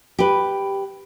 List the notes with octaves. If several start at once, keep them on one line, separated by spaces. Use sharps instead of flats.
G4 B4